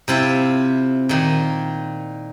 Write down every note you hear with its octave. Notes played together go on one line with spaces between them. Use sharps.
C3 E4 F4
A#2 D#3